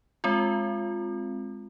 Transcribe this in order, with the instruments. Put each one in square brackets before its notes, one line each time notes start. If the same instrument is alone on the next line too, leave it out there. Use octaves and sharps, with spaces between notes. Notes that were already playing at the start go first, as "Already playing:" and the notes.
[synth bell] G#3 C4 F4